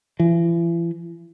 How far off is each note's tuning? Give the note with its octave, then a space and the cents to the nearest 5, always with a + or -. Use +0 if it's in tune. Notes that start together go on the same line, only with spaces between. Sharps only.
E3 +40